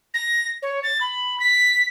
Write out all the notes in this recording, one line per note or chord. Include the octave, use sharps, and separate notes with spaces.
A#6
C#5
A6
B5
B6